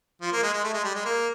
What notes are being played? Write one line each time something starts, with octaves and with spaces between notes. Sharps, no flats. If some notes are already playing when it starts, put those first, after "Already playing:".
F3
A#3
G#3
G#3
A3
G#3
G3
G#3
A#3